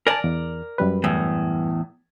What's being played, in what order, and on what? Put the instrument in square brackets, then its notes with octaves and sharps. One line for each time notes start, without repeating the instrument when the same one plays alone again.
[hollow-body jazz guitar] A#4 D5 [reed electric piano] G#5 A5
[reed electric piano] E2
F#2 G3 B4
[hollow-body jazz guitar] E2 A2